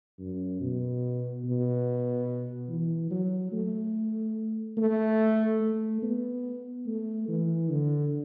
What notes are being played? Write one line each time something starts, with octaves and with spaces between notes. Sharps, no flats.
F#2
B2
B2
E3
F#3
A3
A3
A3
B3
A3
E3
D3